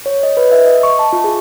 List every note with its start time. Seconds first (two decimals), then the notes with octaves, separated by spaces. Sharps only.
0.06 C#5
0.23 D#5
0.37 B4
0.52 E5
0.66 D#5
0.83 C#6
0.99 A5
1.13 F4
1.24 G#4